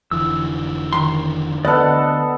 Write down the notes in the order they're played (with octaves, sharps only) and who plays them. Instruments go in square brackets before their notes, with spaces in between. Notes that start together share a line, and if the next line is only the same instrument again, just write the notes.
[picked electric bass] F1 D3 E3 [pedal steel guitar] E6
[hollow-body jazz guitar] D#3 C6
[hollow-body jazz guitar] D2 [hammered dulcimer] B3 A4 [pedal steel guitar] D5 D#5 F#6